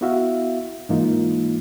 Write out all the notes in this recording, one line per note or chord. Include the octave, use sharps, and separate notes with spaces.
B3 E4 F#4 E5 F5
G#2 E3 A#3 D#4 F4